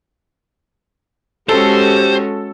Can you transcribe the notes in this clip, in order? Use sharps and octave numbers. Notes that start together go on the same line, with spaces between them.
G#3 C#4 F#4 G4 A4 C5